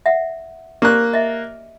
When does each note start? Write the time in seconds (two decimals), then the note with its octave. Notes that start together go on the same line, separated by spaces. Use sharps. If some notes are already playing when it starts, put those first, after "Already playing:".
0.06 E5 F#5
0.82 A#3 G4 D5 F#6
1.13 D#5 E5